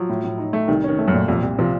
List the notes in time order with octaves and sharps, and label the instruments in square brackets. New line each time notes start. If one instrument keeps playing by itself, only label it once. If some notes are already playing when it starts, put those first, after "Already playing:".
Already playing: [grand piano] F3 [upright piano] F#3
[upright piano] A2
A2
D#4
A3
[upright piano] C2 [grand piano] D#3
[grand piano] D#3 [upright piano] C#4
[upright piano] A3
[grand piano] F#2
[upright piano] A#2
[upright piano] C2 [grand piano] F2
[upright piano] C2
[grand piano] C3 [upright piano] F3